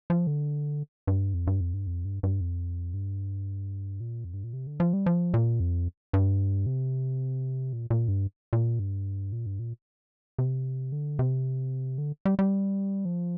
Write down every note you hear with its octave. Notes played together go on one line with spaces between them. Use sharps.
F3
D3
G2
F2
G2
F2
G2
F2
G2
G2
F2
G2
A#2
F2
G2
A#2
C3
D3
F3
G3
F3
A#2
F2
G2
C3
A#2
A#2
G2
A#2
G2
A#2
G2
A#2
C3
D3
C3
D3
G3
G3
F3